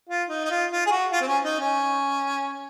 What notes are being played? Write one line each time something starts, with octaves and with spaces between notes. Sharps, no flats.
F4
D#4
D#4
F4
F4
G#4
F#4
F4
C4
C#4
D#4
C#4